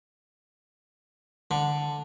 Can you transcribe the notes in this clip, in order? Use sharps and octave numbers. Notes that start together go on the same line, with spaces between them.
D3